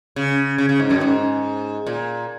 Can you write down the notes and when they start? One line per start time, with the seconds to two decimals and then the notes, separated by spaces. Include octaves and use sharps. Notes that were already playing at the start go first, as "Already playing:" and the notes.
0.16 C#3
0.58 C#3
0.69 C#3
0.80 G#2
0.91 F#2
1.01 G#2
1.87 A#2